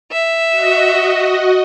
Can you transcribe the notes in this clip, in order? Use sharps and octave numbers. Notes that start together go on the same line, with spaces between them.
E5
F#4 D#5